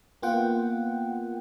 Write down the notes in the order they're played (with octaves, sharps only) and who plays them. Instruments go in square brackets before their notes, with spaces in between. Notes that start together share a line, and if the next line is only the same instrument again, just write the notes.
[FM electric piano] A#3 B3 F4 F#5 G5